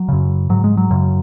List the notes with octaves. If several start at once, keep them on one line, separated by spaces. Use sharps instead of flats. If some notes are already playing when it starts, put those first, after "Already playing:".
Already playing: F#3
F#2 C#3
G#2 F#3
G#3
F#3
F#2 C#3